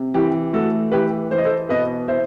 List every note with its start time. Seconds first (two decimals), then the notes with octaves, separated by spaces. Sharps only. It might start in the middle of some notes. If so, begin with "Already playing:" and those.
Already playing: C3
0.14 E3 G4
0.53 A3 F#4 A4
0.91 E3 G4 B4
1.30 E3 C5
1.38 D#5
1.45 A4 C5
1.69 B2 B4 D#5
2.08 E4 C5 E5